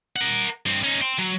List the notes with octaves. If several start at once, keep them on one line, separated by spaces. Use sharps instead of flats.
A#4 F#5
G2 C4
C#4 D#4
G5 C6
F#3